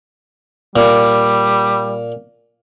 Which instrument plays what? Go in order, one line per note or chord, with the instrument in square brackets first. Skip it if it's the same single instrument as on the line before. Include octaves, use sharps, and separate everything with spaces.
[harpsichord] A#2 [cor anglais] G3